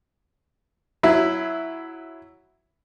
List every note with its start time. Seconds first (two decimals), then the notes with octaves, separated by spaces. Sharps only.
1.03 F#3 E4